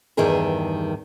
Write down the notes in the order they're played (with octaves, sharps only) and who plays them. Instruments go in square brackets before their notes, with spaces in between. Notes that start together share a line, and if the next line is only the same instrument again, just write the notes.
[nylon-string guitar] E2 G2 D#3 G3 G#4 A#4